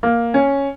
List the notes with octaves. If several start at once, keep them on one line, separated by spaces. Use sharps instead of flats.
A#3
C#4